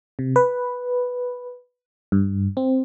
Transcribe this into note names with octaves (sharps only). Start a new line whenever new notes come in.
C3
B4
G2
C4